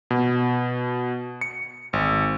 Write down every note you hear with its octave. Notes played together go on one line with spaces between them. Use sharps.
B2
C#7
G#1